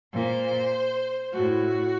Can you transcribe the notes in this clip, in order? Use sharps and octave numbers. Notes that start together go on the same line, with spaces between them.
A#2 C5
A2 F#4